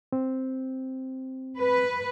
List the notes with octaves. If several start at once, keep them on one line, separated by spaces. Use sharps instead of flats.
C4
B4